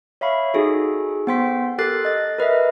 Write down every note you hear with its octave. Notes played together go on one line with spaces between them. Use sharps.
C#5 E5 F5 B5 C#6
D#4 F#4 G#4 A4
B3 C5 G5 C6 B6
G4 A4 A#4 F#6 A6 C7
D#5 A6
A#4 B4 D#5 E5